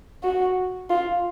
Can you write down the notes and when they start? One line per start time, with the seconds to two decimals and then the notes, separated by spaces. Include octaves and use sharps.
0.24 F#4
0.90 F4